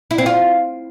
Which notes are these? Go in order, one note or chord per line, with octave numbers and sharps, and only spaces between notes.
E4
C4
F4